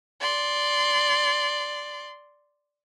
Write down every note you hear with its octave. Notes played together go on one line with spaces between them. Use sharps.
D5 C6